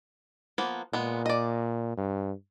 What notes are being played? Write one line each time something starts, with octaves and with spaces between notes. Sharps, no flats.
F3 A#3 B3
A#2 G#3 B3
D5 D#5
G2